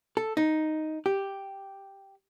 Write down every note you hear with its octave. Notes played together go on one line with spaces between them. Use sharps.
A4
D#4
G4